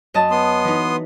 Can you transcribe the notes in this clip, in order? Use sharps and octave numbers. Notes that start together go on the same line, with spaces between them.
F#2 D#5 A5
B3 C6 D#6
E3 D#4